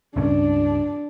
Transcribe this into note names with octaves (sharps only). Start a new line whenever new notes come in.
C#2 G2 C#4 D4